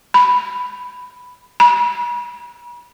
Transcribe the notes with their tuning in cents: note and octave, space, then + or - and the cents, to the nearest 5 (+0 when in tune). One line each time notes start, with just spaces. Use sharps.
B5 +5
B5 -40